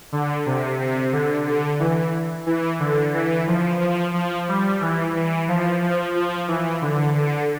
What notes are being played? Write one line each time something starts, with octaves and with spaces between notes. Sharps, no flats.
D3
C3
C3
D3
D3
E3
E3
D3
E3
F3
F3
F3
G3
E3
E3
F3
F3
F3
E3
D3
D3